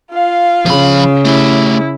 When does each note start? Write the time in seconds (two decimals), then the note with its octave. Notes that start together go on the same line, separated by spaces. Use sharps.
0.12 F4 F5
0.66 C#3 F3 B5
1.25 A3 E4 G4